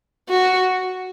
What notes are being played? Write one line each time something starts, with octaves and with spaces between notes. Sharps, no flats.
F#4